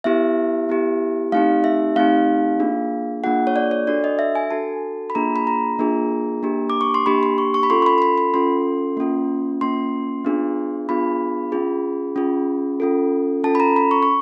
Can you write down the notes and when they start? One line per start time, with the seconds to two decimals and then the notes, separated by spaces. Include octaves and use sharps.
0.04 B3 E4 G4 E5
0.69 B3 E4 G4
1.32 A3 C4 D#4 G4 F5
1.64 E5
1.96 A3 C4 D#4 G4 F5
2.60 A#3 D4 F4 G#4
3.24 A#3 D4 F4 G#4 F#5
3.47 C#5
3.56 D5
3.71 C#5
3.87 D4 F#4 A4 D5
4.04 D#5
4.19 E5
4.35 G#5
4.51 D4 F#4 A4 A5
5.10 B5
5.15 A#3 D4 F4 G#4 A#5
5.36 B5
5.47 A#5
5.79 A#3 D4 F4 G#4
6.43 A#3 D4 G4
6.70 D6
6.81 C#6
6.94 C6
7.06 A#3 D4 G4 B5
7.23 C6
7.38 C#6
7.54 C#6
7.63 B5
7.70 C#4 F4 A4 C6
7.82 C6
7.86 B5
7.98 C6
8.02 B5
8.18 B5
8.34 C#4 F4 A4 C6
8.97 A#3 C#4 F4
9.61 A#3 C#4 F4 C6
10.24 B3 D4 F4 G#4
10.89 B3 D4 F4 G#4 B5
11.52 C#4 F4 G#4
12.16 C#4 F4 G#4
12.80 C#4 F4 A4
13.44 C#4 F4 A4 A5
13.55 B5
13.60 A#5
13.76 B5
13.91 C#6
14.03 C#6